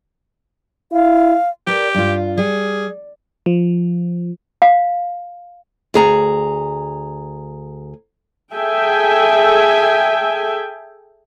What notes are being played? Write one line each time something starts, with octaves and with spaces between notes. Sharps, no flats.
E4 F5
G4 A#4 B4 D5
G2 F4
G3 G#4
F3
F5
D2 G#4 A#5
G#4 A4 E5 G5 G#5